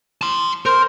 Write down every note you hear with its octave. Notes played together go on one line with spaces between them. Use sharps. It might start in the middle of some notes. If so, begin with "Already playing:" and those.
A5 C6
A#4 C5